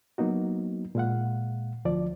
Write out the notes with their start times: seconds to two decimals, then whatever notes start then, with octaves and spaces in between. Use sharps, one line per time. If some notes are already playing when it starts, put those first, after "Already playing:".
0.18 F#3 A#3 B3 D#4 F#4
0.95 A#2 G#3 F5 F#5
1.85 D2 F3 D5